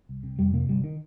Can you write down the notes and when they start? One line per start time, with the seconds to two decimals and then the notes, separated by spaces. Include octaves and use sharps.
0.09 C2
0.23 C3
0.39 F2 G3
0.53 C3 A#3
0.69 G1 G3
0.84 D#3